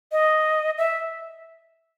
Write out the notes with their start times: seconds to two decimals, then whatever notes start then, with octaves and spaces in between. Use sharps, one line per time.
0.12 D#5
0.78 E5